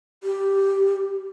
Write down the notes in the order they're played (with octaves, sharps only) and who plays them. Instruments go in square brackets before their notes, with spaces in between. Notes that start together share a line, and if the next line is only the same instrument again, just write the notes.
[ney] G4